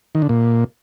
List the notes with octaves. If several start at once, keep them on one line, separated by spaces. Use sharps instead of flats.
D#3
D3
A#2